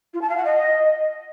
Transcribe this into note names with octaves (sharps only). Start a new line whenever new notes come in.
F4
A5
F5
F#5
D#5